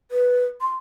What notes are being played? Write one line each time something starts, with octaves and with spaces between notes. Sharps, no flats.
B4
C6